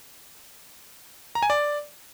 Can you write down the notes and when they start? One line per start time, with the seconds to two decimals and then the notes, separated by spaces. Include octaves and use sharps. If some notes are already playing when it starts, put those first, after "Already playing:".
1.35 A#5
1.43 G#5
1.50 D5